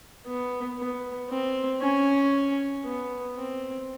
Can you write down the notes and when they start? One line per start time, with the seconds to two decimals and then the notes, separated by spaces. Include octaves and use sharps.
0.27 B3
0.78 B3
1.30 C4
1.82 C#4
2.85 B3
3.37 C4